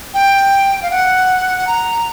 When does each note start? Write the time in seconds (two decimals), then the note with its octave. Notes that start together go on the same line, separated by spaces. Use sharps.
0.14 G5
0.83 F5
0.91 F#5
1.67 A#5